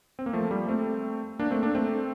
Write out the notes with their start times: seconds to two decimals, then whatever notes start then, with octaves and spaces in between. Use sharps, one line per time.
0.19 C4
0.26 A#3
0.33 F3 A3
0.51 G3 A#3
0.68 A3 C4
1.39 A#3 D4
1.51 A3 C4
1.63 A#3 D4
1.75 A3 C4